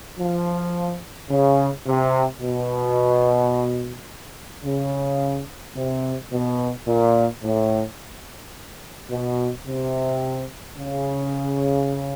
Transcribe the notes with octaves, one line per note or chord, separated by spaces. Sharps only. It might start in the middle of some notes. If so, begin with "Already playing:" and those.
F3
C#3
C3
B2
C#3
C3
B2
A#2
A2
B2
C3
C#3